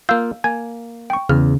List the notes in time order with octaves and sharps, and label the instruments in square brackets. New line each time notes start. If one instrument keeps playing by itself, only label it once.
[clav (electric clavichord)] A#3 F4 [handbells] F5 E6 G6
[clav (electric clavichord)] A#3 [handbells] G#5 G#6
[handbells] G5 C#6
[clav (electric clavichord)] E2 [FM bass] C#3 [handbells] F6